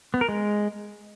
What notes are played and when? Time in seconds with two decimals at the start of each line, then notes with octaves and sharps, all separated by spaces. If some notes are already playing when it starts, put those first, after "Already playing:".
0.14 B3
0.21 A#4
0.29 G#3